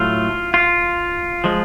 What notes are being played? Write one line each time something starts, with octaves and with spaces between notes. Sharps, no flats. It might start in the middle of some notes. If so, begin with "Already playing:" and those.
Already playing: A2 F#3 A3 F4
F4
F3 G#3